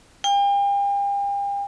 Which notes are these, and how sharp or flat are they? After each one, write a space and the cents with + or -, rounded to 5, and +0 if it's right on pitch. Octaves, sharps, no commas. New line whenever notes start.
G5 +40